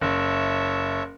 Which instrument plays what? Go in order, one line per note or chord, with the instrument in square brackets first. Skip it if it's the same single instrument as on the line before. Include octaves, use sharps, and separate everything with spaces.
[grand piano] F#1 [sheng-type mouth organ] C#5 E5 A5